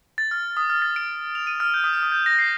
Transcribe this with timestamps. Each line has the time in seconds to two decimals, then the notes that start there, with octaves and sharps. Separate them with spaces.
0.18 A6
0.31 F6
0.57 D#6
0.70 F6
0.82 A6
0.96 D7
1.35 F7
1.47 D#7
1.60 F6
1.74 G6
1.84 D#6
1.93 F6
2.03 D#6
2.12 G6
2.26 A#6
2.39 C7